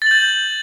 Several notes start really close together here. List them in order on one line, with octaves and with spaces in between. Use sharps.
A6 F#7 G6